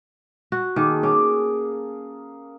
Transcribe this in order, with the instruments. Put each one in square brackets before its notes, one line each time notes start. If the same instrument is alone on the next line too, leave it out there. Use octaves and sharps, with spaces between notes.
[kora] F#4
[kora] D#3 [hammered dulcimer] A#3 G#4 A4
[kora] C#4 [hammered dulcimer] G#4 D6